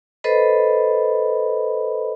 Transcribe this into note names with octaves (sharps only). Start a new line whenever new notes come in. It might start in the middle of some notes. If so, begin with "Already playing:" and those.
A4 B4 C5 D#5 B5